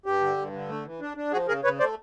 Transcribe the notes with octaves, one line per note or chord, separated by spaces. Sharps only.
G2 G4
D3
G2
D3
A3
E3
D4
D4
F3 F#4 G#4
C#3 G#4 A#4
C#3 B4 C#5
A3 C5 D5